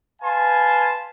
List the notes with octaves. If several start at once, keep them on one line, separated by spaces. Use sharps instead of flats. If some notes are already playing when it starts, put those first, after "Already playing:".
B4 F5 G#5 A5 C6